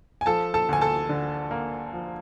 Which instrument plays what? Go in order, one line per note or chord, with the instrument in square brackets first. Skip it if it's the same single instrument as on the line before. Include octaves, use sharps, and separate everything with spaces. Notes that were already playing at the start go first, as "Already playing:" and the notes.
[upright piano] G#5
F3 A4 A5
A4 A5
D2 G#5
A4 A5
D3
A#3
F3